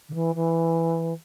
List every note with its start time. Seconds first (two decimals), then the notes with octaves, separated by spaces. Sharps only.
0.09 D3
0.14 E3
0.35 E3